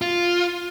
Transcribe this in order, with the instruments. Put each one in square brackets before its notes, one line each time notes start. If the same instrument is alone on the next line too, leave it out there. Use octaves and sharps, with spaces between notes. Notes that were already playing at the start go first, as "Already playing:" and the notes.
[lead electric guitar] F4